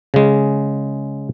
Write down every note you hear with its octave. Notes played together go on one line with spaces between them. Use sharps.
C#3 G#3